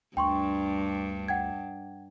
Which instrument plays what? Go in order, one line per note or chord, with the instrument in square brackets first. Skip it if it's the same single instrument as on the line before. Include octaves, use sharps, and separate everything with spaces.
[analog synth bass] D2 [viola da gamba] G2 D4 [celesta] G5 C6 C#6
[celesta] F#5 G5 G#6